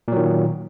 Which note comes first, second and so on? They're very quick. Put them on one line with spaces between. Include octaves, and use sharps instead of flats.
A#2 F#3 D#3